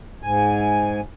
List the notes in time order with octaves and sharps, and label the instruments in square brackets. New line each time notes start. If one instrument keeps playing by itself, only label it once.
[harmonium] G#2 G#5